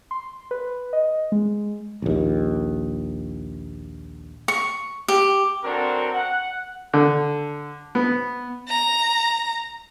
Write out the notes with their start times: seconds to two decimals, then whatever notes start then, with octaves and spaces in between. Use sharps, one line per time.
0.11 C6
0.51 B4
0.93 D#5
1.32 G#3
2.02 A#1 D#2
4.48 C#6
5.08 G4
5.64 F#3 C4 D4 F#4 A4 A#4
6.13 F#5
6.93 D3
7.95 B3
8.69 A#5